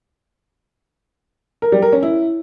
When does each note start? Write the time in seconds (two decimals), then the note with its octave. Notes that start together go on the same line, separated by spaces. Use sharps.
1.62 A#4
1.72 G3
1.82 A#4
1.93 C#4
2.03 E4